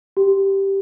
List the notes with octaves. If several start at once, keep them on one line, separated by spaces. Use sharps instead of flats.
G4